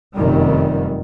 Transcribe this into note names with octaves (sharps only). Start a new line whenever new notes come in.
F1 F#2 D#3 G3